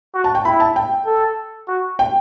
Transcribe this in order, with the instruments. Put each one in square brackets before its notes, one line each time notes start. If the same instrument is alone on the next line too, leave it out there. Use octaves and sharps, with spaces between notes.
[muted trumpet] F#4
[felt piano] A5
G5
[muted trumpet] E4 [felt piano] B5
[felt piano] A5
G5
[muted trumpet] A4
F#4
[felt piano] G5